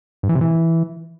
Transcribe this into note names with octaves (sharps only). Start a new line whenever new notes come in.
G2
E3
C3
E3